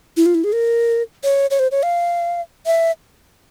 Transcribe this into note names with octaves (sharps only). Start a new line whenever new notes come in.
E4
F4
E4
G#4
A#4
C#5
C#5
C5
C#5
F5
E5